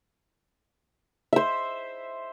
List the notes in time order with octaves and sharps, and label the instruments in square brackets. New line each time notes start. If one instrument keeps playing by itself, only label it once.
[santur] C5 E5